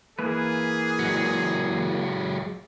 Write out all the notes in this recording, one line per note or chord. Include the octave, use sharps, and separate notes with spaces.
E3 A#3 G#4 B4
F#3 G#3